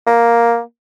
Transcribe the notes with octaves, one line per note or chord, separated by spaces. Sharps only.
A#3